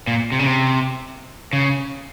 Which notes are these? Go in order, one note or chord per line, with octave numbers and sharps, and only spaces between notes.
A#2
C3
C#3
C3
C#3